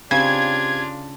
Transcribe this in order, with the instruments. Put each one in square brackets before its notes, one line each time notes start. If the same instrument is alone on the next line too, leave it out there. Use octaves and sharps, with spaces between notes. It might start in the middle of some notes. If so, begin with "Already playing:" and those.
[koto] C#3 [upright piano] C4 G4 [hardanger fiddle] D4 F4 [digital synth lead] G#6